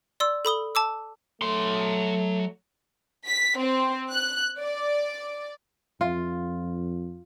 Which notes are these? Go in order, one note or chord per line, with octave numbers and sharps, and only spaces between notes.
D5 C6 E6
A4 B5 D#6 G7
A5 D6 E6
F#3 A3 C6
B6
C4
F#6
D5
F2 F4